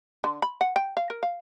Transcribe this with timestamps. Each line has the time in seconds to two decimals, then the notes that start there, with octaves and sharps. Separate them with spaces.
0.24 D3
0.42 B5
0.61 F#5
0.76 G5
0.97 F5
1.10 A#4
1.23 F5